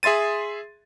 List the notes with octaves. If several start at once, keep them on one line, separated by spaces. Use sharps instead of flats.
G#4 E5 C6 A6 D#7